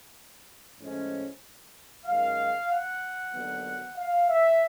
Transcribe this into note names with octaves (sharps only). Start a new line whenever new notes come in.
A2 F3 G#3 C#4
F#2 D#3 G#3 F5
F#5
D#2 D3 F#3 B3
F5
E5